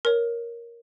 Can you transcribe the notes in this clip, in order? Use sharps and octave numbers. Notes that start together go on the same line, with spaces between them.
A#4 C#5